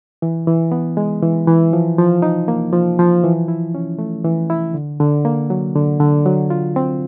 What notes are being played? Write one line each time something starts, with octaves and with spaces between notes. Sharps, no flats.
E3
E3
B3
G#3
E3
E3
F3
F3
D#4
A#3
F3
F3
E3
E4
C#4
A3
E3
E4
D3
D3
A#3
F#3
D3
D3
F#3
F4
C4